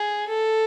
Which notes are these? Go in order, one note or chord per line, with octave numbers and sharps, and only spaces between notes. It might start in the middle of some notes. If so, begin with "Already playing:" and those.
Already playing: G#4
A4